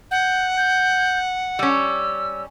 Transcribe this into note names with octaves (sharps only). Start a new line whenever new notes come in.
F#5 G6
G6
G3 C#4 E6